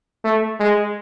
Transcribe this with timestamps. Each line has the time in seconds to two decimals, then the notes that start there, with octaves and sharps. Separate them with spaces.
0.24 A3
0.60 G#3